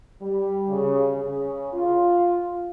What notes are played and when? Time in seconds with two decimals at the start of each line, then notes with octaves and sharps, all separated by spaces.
0.21 G3
0.68 C#3
1.11 C#3
1.72 F4